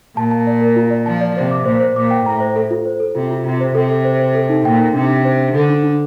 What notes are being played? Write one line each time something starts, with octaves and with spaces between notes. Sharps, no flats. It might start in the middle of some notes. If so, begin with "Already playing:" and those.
A#2 A5
A5
D5
A#4
F4
D5
F3 A5
D5
C3 C5
D6
A#2 C5
C5
A#2 D6
G5
A2 A#5
C5
A4
F4
C5
A4
C3 F4
F4
C3 F4
C5
C3 A4
A4
C5
C5
A4
D#4
A#2 G5
D#4
C3 D4
D4
C5
D4
D3 A4
D4
D4